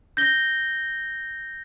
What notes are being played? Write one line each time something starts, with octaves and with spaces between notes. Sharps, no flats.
G6 A#6 G7